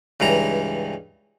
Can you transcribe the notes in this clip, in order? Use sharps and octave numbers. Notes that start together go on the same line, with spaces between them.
C#2 G2 E3 A#5